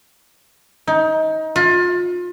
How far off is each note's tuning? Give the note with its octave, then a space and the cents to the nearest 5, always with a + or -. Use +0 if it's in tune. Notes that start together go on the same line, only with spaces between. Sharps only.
D#4 +25
F4 +30